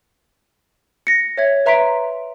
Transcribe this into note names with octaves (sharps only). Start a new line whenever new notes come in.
A#6 C#7
C#5 E5 G#6
B4 E5 A#5 C6 B6 D7